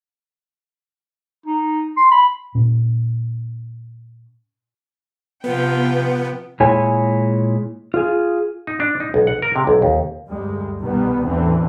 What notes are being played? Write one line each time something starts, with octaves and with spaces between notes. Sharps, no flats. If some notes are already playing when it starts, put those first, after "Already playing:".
D#4
C6
B5
A#2 C#4
C3 F3 B3 G5
A#2 G#3 E4 C#5 G#5
F4 G#4
D#4
D4
D#4
B1
F#5
A#4
C3
B1
D#2
D2 G2 G3 G#3
C2 B2 D#3 G3 B3
A1 E2 D3 E3 C4